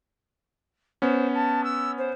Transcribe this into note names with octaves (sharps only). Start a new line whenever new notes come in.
B3 C#4 C5
A5
E6
C5